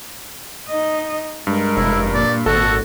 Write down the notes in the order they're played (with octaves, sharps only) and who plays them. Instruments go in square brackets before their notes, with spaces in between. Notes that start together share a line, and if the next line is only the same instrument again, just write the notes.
[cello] D#4 D#5
[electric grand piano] G2 [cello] G#3 A#4
[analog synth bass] F1 [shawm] E4
[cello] A#2 [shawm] D5
[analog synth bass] G#1 [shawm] F#4 [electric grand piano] A4